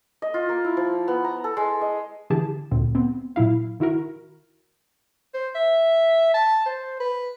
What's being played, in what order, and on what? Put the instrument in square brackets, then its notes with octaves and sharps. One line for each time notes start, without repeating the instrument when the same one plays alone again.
[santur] D#5
F4
A#3
E4
F3
B3
A#5
A4
G#3
D#5
[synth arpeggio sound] D3 E3 G4 G#4 A5
D2 A#2 C4
B3 C4
A#2 F#3 E4 F5
D#3 E4 F#4 A#4
[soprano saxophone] C5
E5
A5
C5
B4